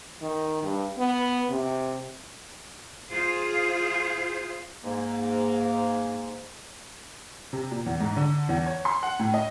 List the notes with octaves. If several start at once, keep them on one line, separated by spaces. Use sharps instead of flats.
D#3
G2
B3
C3
F4 G#4 C5
G#2 A#3
C3
A#2
E2
G#2
D3
E2
C#5
C6
F#5
A2
D#5